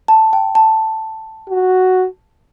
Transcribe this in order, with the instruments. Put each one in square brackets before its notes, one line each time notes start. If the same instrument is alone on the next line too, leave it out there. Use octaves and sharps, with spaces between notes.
[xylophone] A5
G5
A5
[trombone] F#4